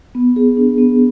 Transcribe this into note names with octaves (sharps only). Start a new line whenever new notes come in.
B3
G#4
D4
B3